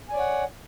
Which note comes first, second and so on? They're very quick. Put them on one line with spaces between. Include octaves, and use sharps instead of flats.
G#5 D5 C#5 F#5